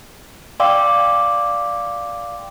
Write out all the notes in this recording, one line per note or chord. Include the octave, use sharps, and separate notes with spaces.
D5 F5 G5 C6 D6 E6